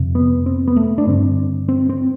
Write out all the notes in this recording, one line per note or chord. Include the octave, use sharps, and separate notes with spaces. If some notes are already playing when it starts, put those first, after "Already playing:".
Already playing: F2 C3
B3
C4
B3
A3
D4
G2 D3 C4
C4
C4